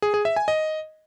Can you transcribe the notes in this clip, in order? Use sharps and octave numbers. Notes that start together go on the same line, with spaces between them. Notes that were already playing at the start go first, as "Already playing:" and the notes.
G#4
G#4
E5
G#5
D#5